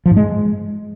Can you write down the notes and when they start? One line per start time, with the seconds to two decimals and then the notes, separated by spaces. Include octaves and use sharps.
0.06 F3
0.11 G#2
0.17 G#3